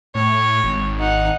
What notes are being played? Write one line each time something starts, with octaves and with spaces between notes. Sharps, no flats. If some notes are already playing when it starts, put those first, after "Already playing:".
A2 C#5
G#1
D#4 F#5